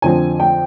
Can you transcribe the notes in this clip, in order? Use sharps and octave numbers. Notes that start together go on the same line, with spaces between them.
F2 D3 F3 C4 G#5
G5